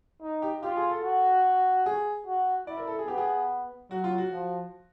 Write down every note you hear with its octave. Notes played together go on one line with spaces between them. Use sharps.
D#4
G4
F4 G4
G#4
A4
F#4
G#4
F#4
E4 D5
A#4
A4
G#4
B3 G4
G#4
F#3 F#4
F4
F#4
F3